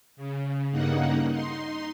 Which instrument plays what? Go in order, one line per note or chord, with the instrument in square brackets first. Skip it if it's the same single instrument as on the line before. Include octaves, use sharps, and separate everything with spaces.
[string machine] C#3
G2 C#3 A#3 D#4 F#5
D#4 C6